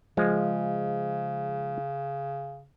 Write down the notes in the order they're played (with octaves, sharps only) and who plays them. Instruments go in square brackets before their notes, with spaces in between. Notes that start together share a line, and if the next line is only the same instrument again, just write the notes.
[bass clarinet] C#3 [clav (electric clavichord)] F3 G#3